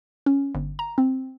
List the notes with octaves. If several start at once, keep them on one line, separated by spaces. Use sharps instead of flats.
C#4
G1
A#5
C4